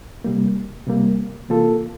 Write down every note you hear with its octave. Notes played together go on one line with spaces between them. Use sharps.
C3 G3 A#3
C3 G3 A#3
C3 E3 A#3 F4 A4